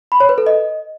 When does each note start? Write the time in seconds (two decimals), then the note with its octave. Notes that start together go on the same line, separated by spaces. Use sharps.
0.12 B5
0.20 C#5
0.29 B4
0.38 A4
0.47 D#5